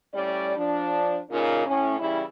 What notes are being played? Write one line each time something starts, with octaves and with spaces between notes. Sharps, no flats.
A2 G3 C#4 D5
F3 D4
A#2 C#3 C#4 D#4 F4 A#4
A2 C#4
C#3 E3 G3 E4